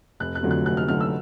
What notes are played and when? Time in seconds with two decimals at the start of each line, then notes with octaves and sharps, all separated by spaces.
0.20 F1 F#6
0.35 F#6
0.43 F2 D3 F#3 A3
0.51 F#6
0.65 F1 F#6
0.77 F6
0.88 F2 D3 F#3 A3 F6
1.01 E6